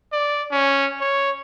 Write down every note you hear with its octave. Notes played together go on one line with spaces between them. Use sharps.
D5
C#4
C#5